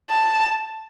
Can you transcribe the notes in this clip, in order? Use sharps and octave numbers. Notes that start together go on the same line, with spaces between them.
A5